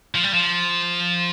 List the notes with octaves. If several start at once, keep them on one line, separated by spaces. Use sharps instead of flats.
F3
G3
F3